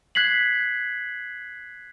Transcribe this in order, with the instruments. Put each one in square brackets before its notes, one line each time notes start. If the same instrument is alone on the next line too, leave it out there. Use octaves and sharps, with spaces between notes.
[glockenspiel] F#6 G#6 B6 C7 F#7